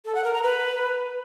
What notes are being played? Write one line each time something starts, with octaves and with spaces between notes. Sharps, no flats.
A4
F#5
A#4
A#5
B4